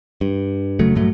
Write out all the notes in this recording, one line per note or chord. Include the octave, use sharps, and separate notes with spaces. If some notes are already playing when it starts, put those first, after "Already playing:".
G2
F1 C#3 F#3 A3
A#1 G2 F#3 A3